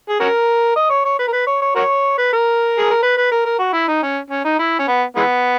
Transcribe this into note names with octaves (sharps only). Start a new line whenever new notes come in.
G#4
C#4 F#4 A#4
D#5
C#5
C#5
B4
A#4
B4
C#5
C#5
F#4 A#4 C#5
B4
A#4
G#4
A#4
B4
B4
A#4
A#4
F#4
E4
D#4
C#4
C#4
D#4
E4
C#4
B3
E3 G#3 B3